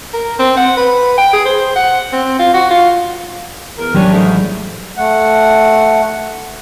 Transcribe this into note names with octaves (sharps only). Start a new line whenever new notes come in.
A#4
C4
F#5
B4
G5
G#4
C5
F#5
C4
F4
F#4
F4
E2 A#4
A1 F#3 G3 C#4 D4 G4
G#2 D#3 A3
A3 F#5